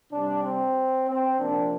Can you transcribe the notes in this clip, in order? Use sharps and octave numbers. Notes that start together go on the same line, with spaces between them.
C3 G3 C4 D4
C4
C4
C3 F3 A#3 D4